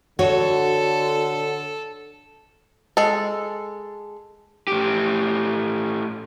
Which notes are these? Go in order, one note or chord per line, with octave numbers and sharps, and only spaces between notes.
D3 F#4 A4 C#5
G#3 A4
A2 G4